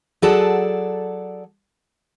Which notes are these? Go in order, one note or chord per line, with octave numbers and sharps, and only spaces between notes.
F#3 G#4 A4 D5 F#5 A5